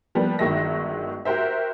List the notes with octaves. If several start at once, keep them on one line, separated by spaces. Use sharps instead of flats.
F3 G3 A#3 B3
G1 D#3 F#3 G#3 E5 A#6
F#4 G4 A#4 C5 E5